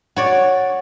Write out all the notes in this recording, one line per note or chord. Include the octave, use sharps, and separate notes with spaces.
F#4 C#5 D5